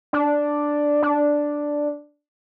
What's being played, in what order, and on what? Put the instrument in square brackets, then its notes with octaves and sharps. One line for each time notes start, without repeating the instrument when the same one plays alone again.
[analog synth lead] D4
D4